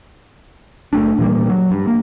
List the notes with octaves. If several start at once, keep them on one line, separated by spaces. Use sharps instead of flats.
F#1 A3 D4
A#2 E3 G3 A#3
F#3
G2
A#3